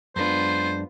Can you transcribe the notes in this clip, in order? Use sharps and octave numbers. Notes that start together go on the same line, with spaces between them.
F#2 G#3 B3 D4 F4 C5